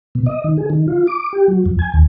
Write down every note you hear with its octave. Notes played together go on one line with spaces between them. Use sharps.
B2
D#5
D#3
G#4
D#3
F4
D6
G4
F#3
F2
G#5
D#2